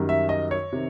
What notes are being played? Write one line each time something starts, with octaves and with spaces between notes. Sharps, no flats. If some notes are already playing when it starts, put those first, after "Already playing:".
Already playing: F#2 D#3 G3
E5
D#5
C#5
C3 D#3